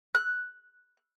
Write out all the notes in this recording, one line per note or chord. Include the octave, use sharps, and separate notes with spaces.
F#6